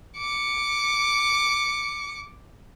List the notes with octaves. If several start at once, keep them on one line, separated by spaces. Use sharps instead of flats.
D6 C#7